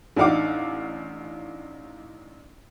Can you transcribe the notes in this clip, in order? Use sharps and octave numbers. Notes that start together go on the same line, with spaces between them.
A1 D4 D#4 F5 F#5 D6